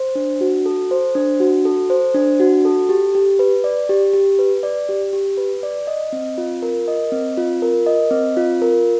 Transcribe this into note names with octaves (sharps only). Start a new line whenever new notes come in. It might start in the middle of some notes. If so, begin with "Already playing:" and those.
Already playing: C5
D4
F#4
A4
C5
D4
F#4
A4
C5
D4
F#4
A4
G4
G4
B4
D5
G4
G4
B4
D5
G4
G4
B4
D5
D#5
C4
F4
A#4
D#5
C4
F4
A#4
D#5
C4
F4
A#4